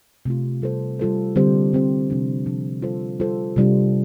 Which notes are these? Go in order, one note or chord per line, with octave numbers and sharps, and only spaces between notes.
C3 A3 F4
G3 F4 A4 C5
G3 F4 A4 C5
D3 G3 C4 G4 C5
D3 G3 C4 G4 C5
C3 F3 D4
C3 F3 D4
G3 F4 A4 C5
G3 F4 A4 C5
C3 G3 D4 F4